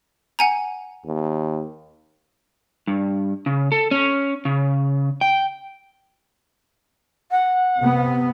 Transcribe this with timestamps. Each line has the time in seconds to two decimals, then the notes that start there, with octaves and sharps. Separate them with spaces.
0.39 F#5 G#5 A#5
1.05 D#2
2.88 G2
3.46 C#3
3.72 A4
3.91 C#4
4.45 C#3
5.21 G5
7.31 F#5
7.80 C3 B3